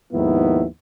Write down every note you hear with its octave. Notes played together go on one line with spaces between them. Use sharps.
D#2 G#2 D#3 F3 B3 E4